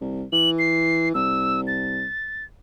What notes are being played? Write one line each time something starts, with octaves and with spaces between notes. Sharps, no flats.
C2
E3 F#7
C7
C2 E6
A6